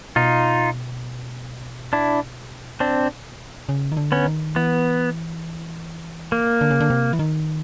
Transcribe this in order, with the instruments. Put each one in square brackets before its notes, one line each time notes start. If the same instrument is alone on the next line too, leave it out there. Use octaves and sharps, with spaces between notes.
[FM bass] B2 [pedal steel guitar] D#4 F4
[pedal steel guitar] D4 E4
C4 D4
[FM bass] C#3
D#3
D3
[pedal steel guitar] B3 C#4
[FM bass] D#3
[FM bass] E3 [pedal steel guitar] B3
[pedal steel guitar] A#3
[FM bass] D3
C#3
D3
C3
E3
D#3